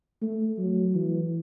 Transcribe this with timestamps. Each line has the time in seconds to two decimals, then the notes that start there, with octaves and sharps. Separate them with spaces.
0.22 A3
0.58 F#3
0.95 E3